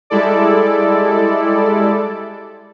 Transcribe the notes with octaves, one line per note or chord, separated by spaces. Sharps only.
G3 G#3 E4 A4 D5